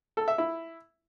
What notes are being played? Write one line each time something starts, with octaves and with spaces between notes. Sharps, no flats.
A4
E5
E4